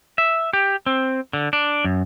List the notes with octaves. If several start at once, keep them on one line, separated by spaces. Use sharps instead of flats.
E5
G4
C4
D3
D4
F#2